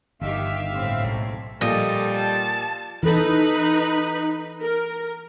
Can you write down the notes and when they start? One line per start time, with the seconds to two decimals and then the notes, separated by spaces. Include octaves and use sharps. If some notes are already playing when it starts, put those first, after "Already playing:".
0.21 G1 D#3 G4 E5 F5
0.71 A2 C4
1.04 B1 G#2
1.61 A#2 F3 G3 A4 D#5
2.15 A5
3.03 E3 D#4 A4 B4
4.62 A#4